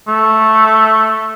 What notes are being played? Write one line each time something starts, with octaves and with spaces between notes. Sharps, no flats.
A3